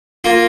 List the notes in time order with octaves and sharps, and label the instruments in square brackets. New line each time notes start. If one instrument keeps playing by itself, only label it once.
[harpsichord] A#3 F4